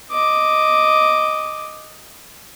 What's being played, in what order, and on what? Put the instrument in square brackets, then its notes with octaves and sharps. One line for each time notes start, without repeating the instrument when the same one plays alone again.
[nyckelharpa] D#5 D6